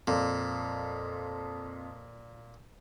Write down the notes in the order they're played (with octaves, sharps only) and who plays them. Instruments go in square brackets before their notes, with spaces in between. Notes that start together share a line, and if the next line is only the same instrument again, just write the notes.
[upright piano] F2 [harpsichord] A#2